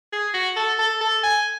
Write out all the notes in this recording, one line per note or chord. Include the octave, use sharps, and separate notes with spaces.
G#4
F#4
A4
A4
A4
G#5